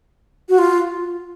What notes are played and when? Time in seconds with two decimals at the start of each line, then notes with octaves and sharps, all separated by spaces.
0.49 F#4
0.58 F4